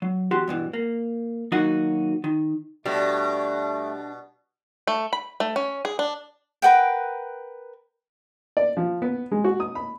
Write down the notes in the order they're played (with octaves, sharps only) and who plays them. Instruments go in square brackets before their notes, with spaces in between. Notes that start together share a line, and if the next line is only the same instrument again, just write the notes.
[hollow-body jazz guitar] F#3
E2 F#4 G4 C6
G2 B2 E3
A#3
D#3 F#3 A#3 D#4 F#4
D#3
[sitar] B2 [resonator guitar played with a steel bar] G3 [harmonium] A3 [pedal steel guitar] D4
[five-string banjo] A3
B5
A3
C#4
G#4
D4
[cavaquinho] A#4 B4 F#5 G5
[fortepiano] D5
F3
B3
G#3
F#4
D#6
B5